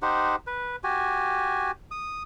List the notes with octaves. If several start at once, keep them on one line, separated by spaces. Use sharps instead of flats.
D#4 G4 C5 F#5
B4
F#4 G4 G#5
D#6